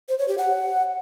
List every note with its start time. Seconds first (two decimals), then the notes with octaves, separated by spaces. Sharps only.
0.09 C5
0.19 C#5
0.28 G4
0.38 F#5